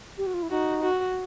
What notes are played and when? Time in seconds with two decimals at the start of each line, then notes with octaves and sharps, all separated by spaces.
0.18 G4
0.26 F#4
0.34 F4
0.43 E4
0.50 D#4 F#4
0.82 F#4